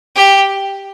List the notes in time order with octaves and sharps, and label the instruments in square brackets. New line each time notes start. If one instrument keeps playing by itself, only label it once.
[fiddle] G4